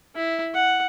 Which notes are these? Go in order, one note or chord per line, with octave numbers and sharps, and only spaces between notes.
E4
F#5